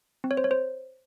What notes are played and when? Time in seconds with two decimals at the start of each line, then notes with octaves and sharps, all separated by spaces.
0.24 C4
0.31 C#5
0.37 C5
0.44 C#5
0.51 C5